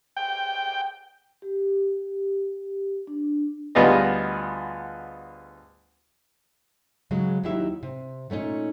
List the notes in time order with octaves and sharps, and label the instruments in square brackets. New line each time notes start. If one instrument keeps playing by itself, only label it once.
[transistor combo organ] G5
[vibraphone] G4
D4
[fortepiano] D2 G3 B3 F4 G#4 D#5
[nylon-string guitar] C#3 F#3 G#3
D#2 F#3 D#4 E4 G4 E5
C3
A#2 A3 C#4 D#4